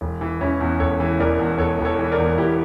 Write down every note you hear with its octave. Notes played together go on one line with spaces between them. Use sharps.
E1
E3
E1 C#4 E4
E2
E1 A4 C#5
E3
E1 A#4 D5
E2
E1 A4 C#5
E1
A4 C#5
E3
A#4 D5
E2
E2 E4 G4